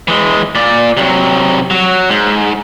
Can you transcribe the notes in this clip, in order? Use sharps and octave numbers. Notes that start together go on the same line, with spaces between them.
E3 G#3
A#2 D5
C3 F#3
F#3
G#2